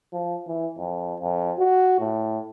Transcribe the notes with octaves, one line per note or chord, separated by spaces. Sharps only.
F3
E3
F2
F2
F#4
A2